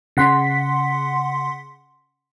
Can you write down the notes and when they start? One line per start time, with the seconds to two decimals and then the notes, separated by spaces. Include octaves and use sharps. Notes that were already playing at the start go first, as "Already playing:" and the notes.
0.17 C#3 F#5 C6 B6